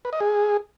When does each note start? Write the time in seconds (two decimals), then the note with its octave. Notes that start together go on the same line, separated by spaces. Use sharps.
0.05 B4
0.13 D#5
0.20 G#4